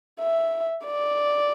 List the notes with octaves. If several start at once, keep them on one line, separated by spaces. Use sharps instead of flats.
E5
D5